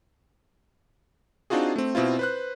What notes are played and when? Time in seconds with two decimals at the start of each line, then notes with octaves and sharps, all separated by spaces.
1.50 C4 D4 D#4 F4 F#4 G#4
1.76 A3 C4
1.95 B2 C4 E4 F4
2.19 B4 C5 F#6